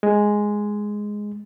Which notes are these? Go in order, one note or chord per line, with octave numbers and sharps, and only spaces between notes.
G#3